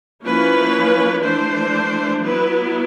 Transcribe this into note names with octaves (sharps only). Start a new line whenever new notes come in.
F3 A#3 C#4 E4 B4
E3 A3 D4 C5
F#3 B3 E4 B4